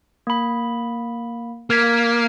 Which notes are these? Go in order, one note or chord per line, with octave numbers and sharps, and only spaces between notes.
A#3 B5
A#3 F6 G#6 B6